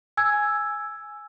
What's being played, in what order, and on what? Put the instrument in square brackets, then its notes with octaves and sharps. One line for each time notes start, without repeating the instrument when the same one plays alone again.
[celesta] G#5 E6 G#6